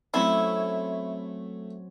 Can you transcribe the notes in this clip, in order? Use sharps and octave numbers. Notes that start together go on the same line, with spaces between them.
F#3 A3 C4 C#4 E4